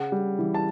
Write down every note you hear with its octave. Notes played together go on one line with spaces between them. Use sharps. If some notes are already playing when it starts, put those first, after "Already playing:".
Already playing: C#3 F#5
G3
E3
A5